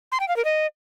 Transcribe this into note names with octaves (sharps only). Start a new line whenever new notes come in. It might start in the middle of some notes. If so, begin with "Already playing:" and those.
C6
G5
F5
A#4
D#5